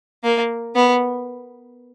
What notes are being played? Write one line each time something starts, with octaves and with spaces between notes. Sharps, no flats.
A#3
B3